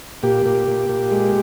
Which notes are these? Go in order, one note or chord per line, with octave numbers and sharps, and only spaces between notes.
A#2 G4
A#2
A#2
A#2
G#3